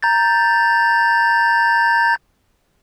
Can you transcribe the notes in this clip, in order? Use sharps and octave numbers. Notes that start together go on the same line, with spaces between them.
A#5 G6 A6